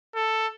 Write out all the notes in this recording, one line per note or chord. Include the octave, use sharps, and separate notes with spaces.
A4